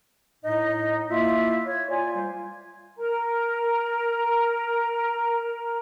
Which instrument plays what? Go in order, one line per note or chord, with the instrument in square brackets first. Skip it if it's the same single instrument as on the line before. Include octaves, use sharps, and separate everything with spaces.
[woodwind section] A2 D#4 [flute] D#5
[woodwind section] A#3 E4 E5 [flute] F4
[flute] C#5
[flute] F4 [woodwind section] D5 G#5
[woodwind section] G3 C5
[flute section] A#4 A#5